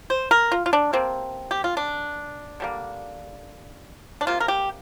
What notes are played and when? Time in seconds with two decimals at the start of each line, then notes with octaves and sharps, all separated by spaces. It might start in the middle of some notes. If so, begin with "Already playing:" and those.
0.10 C5
0.31 A#4
0.52 F4
0.66 F4
0.73 D4
0.93 C3 A#3 C4
1.51 G4
1.64 F4
1.77 D4
2.60 D3 G3 A#3
4.21 D4
4.27 C3 A#3 F4
4.40 A#4
4.48 G4